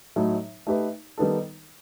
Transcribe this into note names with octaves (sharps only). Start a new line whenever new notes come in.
A2 F#3 A3 D#4
A3 D#4 G4 B4
D#3 G3 B3 D#4 A4